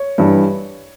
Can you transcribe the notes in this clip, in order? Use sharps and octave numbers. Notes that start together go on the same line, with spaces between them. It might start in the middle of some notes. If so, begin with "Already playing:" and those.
Already playing: C#5
G2 E3